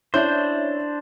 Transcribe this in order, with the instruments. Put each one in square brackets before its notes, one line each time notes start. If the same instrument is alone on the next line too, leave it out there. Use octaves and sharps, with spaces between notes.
[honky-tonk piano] C#4 E4 G6 [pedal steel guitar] D4 C5